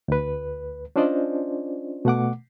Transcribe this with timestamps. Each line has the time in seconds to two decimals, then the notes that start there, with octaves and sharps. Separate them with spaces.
0.08 D2 B4
0.96 C#4 D4 F4 C5 D5 D#5
2.05 B2 A3 F#5 D6